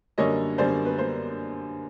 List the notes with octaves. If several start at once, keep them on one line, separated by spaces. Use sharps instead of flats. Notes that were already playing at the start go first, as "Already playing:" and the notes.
F#2 D3 G3 A#3 C#5 D#5
F#2 D3 G3 A#3 C5 D5
B4
A#3 C5